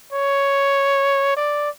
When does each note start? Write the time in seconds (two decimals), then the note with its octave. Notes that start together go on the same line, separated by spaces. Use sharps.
0.13 C#5
1.37 D5